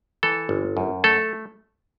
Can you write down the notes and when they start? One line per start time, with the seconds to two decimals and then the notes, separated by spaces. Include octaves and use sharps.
0.23 E3 A4
0.49 G1
0.77 F#2
1.04 A3 A4